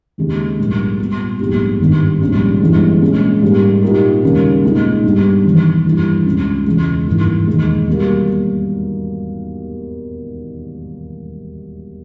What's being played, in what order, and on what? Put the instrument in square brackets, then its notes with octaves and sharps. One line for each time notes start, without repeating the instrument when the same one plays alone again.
[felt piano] D#2 C#3 G#3 C#4 G4
A#1 G#2 G3 A#3
A#2 G3 B3
A#1 G#2 G3 B3 G4
G#1 G2 D#3 G3 B3
A#1 G#2 G3 C#4 G4
G1 G2 E3 G#3
A#2 G#3 C#4
G#2 G3 A#3
A#2 A#3 D#4 G4 A#4
D#2 C#3 G3 A#3 C#4
B1 A#2 G#3 D#4
G2 G3 B3
E1 E2 D#3
G2 E3 G3 A#3
C#2 C#3 G#3 C#4
E1 E2 C#3 G#3
G#1 G2 E3 A#3
E1 D#2 D#3 G#3
B2 G3 A#3